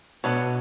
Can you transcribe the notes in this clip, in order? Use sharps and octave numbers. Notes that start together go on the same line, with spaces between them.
B2 B3 D4 A4 C#5